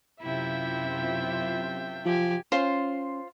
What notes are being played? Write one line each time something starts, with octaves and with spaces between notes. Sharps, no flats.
F#2 C3 E4 F4 E5 G5
F3 G4 G#5
C#4 F4 C5